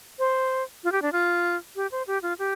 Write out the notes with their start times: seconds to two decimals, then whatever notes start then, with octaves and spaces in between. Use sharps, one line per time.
0.19 C5
0.84 F4
0.92 G4
1.02 D4
1.13 F4
1.76 G4
1.92 C5
2.07 G4
2.22 F4
2.39 G4